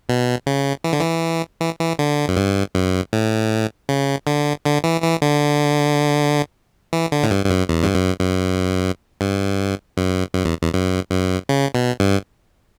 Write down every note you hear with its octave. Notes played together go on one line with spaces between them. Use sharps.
B2
C#3
E3
D3
E3
E3
E3
D3
F#2
G2
F#2
A2
C#3
D3
D3
E3
E3
D3
E3
D3
A2
G2
G2
F#2
E2
G2
F#2
F#2
G2
F#2
F#2
E2
E2
F#2
F#2
C#3
B2
G2